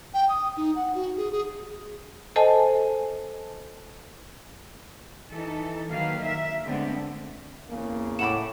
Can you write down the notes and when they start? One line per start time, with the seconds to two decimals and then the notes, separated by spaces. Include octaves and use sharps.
0.14 G5
0.29 D#6
0.57 D#4
0.75 F#5
0.95 F#4
1.17 G#4
1.32 G#4
2.36 A4 C5 D#5 G#5 A5
5.32 E3 D#4 A4
5.89 D#3 F#3 A#3 B4 F5
6.19 A#4 E5
6.64 D3 G#3 A3 B3 C4 D4
7.70 E2 C#3 A#3
8.19 A2 F#5 B5 D6 E7